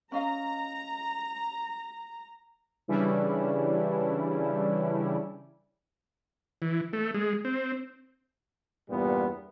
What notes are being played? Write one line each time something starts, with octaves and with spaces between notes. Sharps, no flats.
C#4 D#5 F5 A#5
C#3 E3 G3 C#4 D4 E4
E3
A3
G#3
C4
E2 G2 A#2 G3 B3